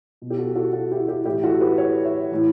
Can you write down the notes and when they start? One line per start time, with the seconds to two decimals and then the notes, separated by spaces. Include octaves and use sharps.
0.22 B2
0.30 G4
0.38 F#4 A4
0.56 F#4 A4
0.73 F#4 A4
0.91 E4 G4
1.08 E4 G4
1.25 A2 E3 E4 G4
1.43 F#4 A4
1.55 A4
1.61 G4 B4
1.78 A4 C#5
2.04 C#5 E5
2.31 A2 E3